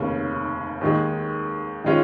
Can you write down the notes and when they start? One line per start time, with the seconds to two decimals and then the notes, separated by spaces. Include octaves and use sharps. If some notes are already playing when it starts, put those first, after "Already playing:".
Already playing: F1 D#2 C#3
0.81 D#2 D#3 G#3
1.84 D#3 G#3 C#4 F4